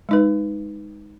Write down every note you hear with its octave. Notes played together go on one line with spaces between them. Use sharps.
G#3 D#4 B4